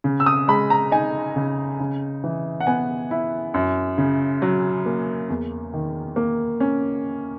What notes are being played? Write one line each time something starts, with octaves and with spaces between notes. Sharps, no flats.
C#3
E6
D#6
G#3 B5
A#5
D#4 G#5
C#3
C#3
E3
F#5
B3 G#5
E4
F#2
C#3
F#3
A#3
E2
D#3
A#3
C#4